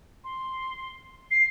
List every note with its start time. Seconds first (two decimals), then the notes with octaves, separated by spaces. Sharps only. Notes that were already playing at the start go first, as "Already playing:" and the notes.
0.24 C6
1.31 C7